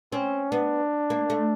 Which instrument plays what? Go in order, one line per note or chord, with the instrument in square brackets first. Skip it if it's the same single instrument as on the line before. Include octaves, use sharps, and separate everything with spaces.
[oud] C4 [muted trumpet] C#4
[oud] B3 [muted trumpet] D4
[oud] A#3
A3